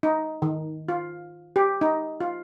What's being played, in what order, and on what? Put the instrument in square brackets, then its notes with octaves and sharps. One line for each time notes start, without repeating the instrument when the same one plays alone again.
[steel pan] D#4
D#3
F4
G4
D#4
F4